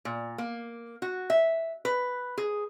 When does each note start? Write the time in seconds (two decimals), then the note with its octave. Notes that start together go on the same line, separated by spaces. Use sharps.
0.05 A#2
0.38 A#3
1.02 F#4
1.30 E5
1.85 B4
2.38 G#4